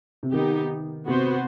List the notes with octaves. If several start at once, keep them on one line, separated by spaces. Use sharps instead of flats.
C3
D#3 B3 D#4 G4
C3 B3 F#4 C5